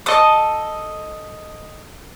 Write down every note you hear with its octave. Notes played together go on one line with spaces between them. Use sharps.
A4 D#5 A5 D#6